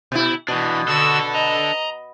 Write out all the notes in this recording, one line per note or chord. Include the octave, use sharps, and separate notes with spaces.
B2 E4
B2 E3 D4
D3 D4 F#4 A4 E6
D#5 A#5